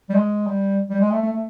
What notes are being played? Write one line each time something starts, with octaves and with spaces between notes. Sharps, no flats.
G3
G#3
G3
G3
G#3
A3
A3
A3